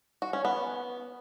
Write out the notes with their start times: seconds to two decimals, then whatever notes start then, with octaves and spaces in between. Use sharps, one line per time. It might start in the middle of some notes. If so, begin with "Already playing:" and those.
0.22 F#4
0.33 C#4
0.45 B3